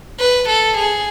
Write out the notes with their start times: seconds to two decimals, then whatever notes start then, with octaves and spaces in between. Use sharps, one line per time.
0.19 B4
0.49 A4
0.77 G#4